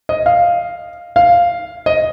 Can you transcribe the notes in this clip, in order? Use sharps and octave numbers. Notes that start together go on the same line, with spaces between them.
D#5
F5
F5
D#5